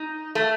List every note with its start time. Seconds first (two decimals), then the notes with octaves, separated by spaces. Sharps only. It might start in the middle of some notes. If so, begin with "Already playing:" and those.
Already playing: D#4
0.35 A3